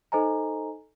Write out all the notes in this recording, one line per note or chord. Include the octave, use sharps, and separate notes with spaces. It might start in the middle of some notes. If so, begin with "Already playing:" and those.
D#4 A4 C5 D#5 G#5 A#5